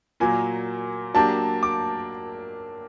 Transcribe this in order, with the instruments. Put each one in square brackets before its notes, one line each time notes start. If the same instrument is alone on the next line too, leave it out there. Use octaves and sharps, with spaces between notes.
[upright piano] A#2 F#3 A#3 [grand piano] G#5
[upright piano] F#3 A#3 D4 G4 [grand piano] A5
[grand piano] D6